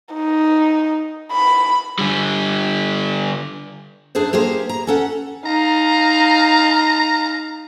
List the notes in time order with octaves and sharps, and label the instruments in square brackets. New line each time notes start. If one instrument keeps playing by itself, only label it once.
[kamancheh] D#4
B5
[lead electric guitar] D3 G3
[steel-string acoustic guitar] F#2 D4 G#4 A4 C5
A#3 G4 G#4 C5
A#5
C#4 A4 F#5
[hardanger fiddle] D#4 F5 [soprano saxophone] A#5